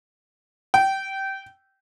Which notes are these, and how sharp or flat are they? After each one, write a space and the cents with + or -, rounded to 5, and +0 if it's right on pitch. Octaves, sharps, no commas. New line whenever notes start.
G5 -20